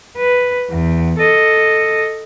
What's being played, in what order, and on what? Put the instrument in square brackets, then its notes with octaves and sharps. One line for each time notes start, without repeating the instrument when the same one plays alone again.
[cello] B4
E2
A4 D#5